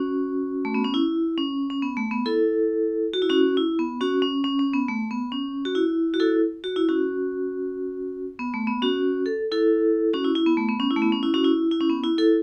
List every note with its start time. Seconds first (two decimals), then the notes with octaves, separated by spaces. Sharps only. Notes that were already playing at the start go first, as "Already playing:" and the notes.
Already playing: C#4 F#4
0.65 A3
0.74 B3
0.84 C#4
0.94 E4
1.38 C#4
1.70 C#4
1.82 B3
1.97 A3
2.11 B3
2.26 E4 A4
3.13 F#4
3.22 E4
3.29 C#4 F#4
3.57 E4
3.79 B3
4.01 C#4 F#4
4.22 C#4
4.44 C#4
4.59 C#4
4.74 B3
4.88 A3
5.11 B3
5.32 C#4
5.65 F#4
5.75 E4
6.14 F#4
6.20 E4 A4
6.64 F#4
6.76 E4
6.89 C#4 F#4
8.39 B3
8.54 A3
8.67 B3
8.82 C#4 F#4
9.26 A4
9.52 E4 A4
10.13 C#4 F#4
10.24 E4
10.35 E4
10.47 B3
10.57 A3
10.69 B3
10.80 C#4
10.91 E4
10.96 A3
11.02 B3
11.12 C#4
11.23 E4
11.34 C#4 F#4
11.44 E4
11.71 E4
11.80 C#4
11.89 B3
12.04 E4
12.18 E4 A4